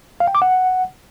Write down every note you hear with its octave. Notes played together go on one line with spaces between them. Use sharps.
F5
G5
D6
F#5